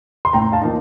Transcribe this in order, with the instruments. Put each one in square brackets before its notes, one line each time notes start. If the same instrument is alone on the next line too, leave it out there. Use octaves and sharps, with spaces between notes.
[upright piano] C6
[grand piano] A2 [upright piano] G5 A#5
[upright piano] F5 A5
[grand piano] F3 A#3 D#4